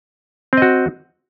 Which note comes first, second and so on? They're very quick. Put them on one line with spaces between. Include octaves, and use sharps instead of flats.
C4 D#5 F#4